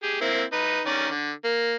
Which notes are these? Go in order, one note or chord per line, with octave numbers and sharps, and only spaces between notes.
G4 G#4
A#3 C4 E4
D#4 B4
D#3 C#4 D5
D3
A#3